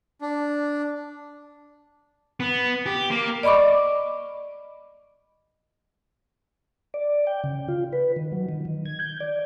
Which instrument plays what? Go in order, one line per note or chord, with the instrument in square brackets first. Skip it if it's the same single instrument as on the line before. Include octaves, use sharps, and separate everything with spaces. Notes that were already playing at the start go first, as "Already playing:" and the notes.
[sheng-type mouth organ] D4
[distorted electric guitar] B3
G4
A#3
[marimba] D5 D#5 B5 C#6 D6
[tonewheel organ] D5
G5
C#3
F4
B4
D#3
F#3
D#3
D#3
G#6
G6
D5